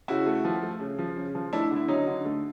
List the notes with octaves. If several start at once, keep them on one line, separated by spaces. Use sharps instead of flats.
C#3 E4 F#4
A3
F3
A3
C#3
F3
C#3
F3
A3 D4 E4
D3
E4
F#3 C#4 D#4
D3
A3